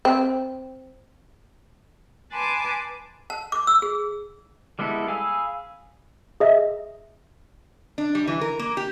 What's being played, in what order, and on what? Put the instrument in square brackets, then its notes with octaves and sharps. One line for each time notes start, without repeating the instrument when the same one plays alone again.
[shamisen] C4
[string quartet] B4 G#5 A5 C6 D6
[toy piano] A5
D6
E6
G#4
[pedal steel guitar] G3 G#3 B3 E4 A4
G#4 F5 G#5 B5 E6
[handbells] G#4 D#5 E5
[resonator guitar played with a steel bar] D4
G3
E3
A#4
A#3
G4